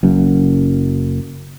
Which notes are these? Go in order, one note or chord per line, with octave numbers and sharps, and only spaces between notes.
F#1 F#2